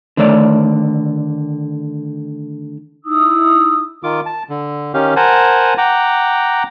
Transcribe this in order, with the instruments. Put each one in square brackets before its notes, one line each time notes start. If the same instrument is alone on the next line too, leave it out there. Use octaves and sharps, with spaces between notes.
[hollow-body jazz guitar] D3 D#3 A3 C#5 D5
[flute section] D#4 E4 D#6 E6
[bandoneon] D#3 F4 D6
A5
D3
D#3 C#4 G4 F5
A#4 C5 F#5 G#5 A5
F#5 G5 A#5 D6